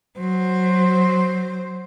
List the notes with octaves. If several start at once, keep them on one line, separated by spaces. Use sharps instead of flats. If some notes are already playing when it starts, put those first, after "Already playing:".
F#3 C5